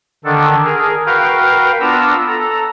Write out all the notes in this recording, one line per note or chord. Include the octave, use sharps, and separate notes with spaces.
D3 D#3 D4 A4
G#4 A#4
F#4 A#4 B4 F5 G5
B3 D4 F4 A#5 E6
A4 A#5